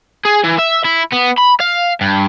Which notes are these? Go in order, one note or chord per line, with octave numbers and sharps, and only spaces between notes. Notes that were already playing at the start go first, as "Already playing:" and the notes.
G#4
E3
E5
E4
B3
B5
F5
G2